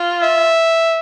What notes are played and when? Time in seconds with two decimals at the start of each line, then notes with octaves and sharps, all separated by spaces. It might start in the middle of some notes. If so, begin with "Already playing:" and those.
Already playing: F4
0.23 E5